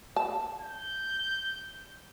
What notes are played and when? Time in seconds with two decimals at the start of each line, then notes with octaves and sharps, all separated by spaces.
0.16 A5
0.61 G6